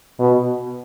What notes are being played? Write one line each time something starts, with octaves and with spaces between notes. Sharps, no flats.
B2